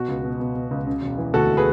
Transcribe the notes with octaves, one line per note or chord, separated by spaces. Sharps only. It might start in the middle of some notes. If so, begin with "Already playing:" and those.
Already playing: B2 F#4
C#2
B2
B2
B2
C#2
C#3
E1
E3
D2 F#4 A4
G#4 B4